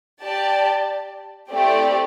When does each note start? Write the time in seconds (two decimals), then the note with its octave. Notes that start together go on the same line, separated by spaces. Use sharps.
0.23 G4 D5 A5
1.50 A3 C4 E4 G4 D5